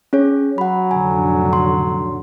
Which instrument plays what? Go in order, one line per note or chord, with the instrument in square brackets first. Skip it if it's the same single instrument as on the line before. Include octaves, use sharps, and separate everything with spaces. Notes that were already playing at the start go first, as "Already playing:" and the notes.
[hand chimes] C#4 G#4 C#5
[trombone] F#3 [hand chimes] F#5 B5
[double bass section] F1 A2 D3 [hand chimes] G#5
[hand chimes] C6